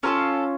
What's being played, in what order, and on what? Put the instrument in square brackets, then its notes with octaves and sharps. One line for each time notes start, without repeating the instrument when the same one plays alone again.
[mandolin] C#4 F4 A4 A#4